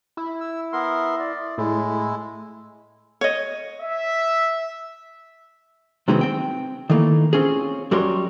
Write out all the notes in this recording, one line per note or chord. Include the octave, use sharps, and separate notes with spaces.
E4
E6
B3 A#4 C6
D5
A2 G#3 E4
C#5 D#5
E5
C3 D#3 F#3 G#3 B3 C4
C4 G5
D#3 E3 A3 A#3
C4 C#4 F4 G#4
F#2 G3 F#4 A#4 C#5 C6